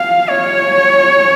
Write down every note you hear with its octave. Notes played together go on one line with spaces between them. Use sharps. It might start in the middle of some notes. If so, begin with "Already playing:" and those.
Already playing: F5
C#5